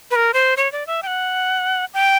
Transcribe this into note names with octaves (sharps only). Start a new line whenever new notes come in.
B4
A#4
C5
C#5
D5
E5
G5
F#5
G5